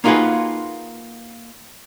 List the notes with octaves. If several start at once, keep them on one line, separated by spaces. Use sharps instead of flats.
A#3 D#4 F4 F#4 G#4 B4